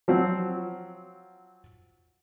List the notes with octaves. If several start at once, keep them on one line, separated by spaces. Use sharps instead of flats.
F3 F#3 C4